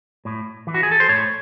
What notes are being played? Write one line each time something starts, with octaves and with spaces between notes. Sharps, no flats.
A2
E3
F#4
G#4
A4
C5
A2 C#5